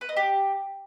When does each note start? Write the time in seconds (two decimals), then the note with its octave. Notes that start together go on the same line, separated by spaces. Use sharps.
0.01 B4
0.09 D#4
0.16 G4